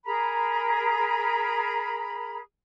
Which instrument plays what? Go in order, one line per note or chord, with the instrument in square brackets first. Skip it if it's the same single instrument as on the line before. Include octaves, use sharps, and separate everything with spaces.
[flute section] G#4 A#4 A#5 B5